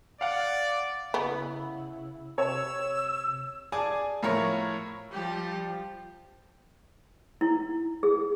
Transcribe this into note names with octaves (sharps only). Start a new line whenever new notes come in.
D5 F5 F#5
C#3 B3 E4
C3 C#5 E6
G#4 D5 G#5 A5
A2 F3 A#4 C#5 C#6
F3 G3 G4
E4
G#4